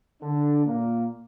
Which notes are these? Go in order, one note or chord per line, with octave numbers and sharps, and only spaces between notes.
D3 D4
A#2 A#3